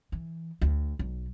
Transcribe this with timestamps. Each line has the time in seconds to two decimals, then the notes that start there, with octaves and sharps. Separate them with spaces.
0.12 E3
0.61 D2
0.99 B1